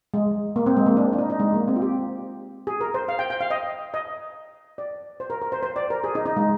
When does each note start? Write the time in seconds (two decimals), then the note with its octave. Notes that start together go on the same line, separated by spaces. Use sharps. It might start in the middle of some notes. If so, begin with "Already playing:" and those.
0.14 G#3
0.56 A#3
0.66 C4
0.77 G#3
0.86 A#3
0.97 D4
1.13 D4
1.18 D#4
1.30 D#4
1.40 G#3
1.54 A#3
1.68 C4
1.76 F4
1.82 G4
2.67 G#4
2.81 A#4
2.94 C5
3.09 F5
3.19 G5
3.30 G5
3.41 F5
3.50 D#5
3.94 D#5
4.78 D5
5.20 C5
5.30 A#4
5.42 A#4
5.52 C5
5.63 C5
5.76 D5
5.90 A#4
6.04 G#4
6.15 D#4
6.26 D#4
6.37 G#3